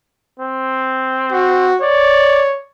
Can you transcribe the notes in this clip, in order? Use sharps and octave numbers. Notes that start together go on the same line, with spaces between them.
C4
F#4
C#5 D5